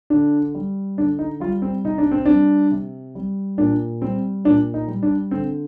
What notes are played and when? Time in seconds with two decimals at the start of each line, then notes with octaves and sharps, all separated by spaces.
0.10 D3 D4
0.55 G3
0.98 D3 D4
1.19 D#4
1.40 G3 F4
1.62 C4
1.85 C3 D#4
1.98 D4
2.11 C4
2.25 G3 D4
2.71 C3
3.15 G3
3.58 A#2 D4
4.01 G3 C4
4.45 A#2 D4
4.74 D#4
4.88 G3
5.03 D4
5.31 D3 C4